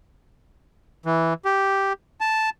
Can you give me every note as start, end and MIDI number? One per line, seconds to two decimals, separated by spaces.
1.06 1.34 52
1.45 1.93 67
2.21 2.50 81